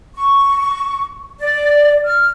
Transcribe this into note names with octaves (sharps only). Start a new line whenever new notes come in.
C#6
D5
F6